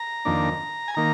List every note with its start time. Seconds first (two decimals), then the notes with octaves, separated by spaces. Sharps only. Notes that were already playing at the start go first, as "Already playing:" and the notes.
Already playing: A#5
0.25 F2 D#3 A#3 D4
0.88 G#5
0.95 D#3 A#3 A#5